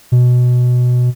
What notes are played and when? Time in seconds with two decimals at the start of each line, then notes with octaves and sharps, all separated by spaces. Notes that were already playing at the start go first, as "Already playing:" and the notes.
0.12 B2